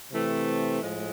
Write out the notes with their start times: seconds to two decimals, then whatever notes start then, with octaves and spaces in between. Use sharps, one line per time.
0.12 C3 E3 A3 C4
0.83 A2 F3 G#3